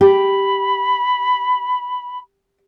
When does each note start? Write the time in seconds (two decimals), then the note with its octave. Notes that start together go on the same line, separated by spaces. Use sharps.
0.01 G4 B5